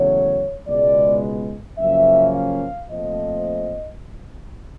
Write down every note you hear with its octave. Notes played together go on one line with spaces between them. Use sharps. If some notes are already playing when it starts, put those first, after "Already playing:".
Already playing: E2 C#3 F#3 A3 C#5
C#2 B2 G#3 B3 D5
F#2 C#3 F3 A#3 C#4 E5
F5
A#2 F3 A3 C4 D#5